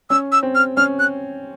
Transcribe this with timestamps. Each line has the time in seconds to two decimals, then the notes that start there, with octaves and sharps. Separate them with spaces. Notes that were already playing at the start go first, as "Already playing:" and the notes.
0.10 C#4 E6
0.32 E6
0.43 C4
0.55 F6
0.77 C#4 F6
0.99 F#6